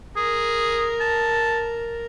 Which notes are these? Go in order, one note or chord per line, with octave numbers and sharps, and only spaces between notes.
G#4 A#4
A5